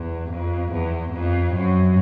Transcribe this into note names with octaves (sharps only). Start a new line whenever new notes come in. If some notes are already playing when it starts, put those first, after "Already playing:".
Already playing: E2
F2
E2
F2
F#2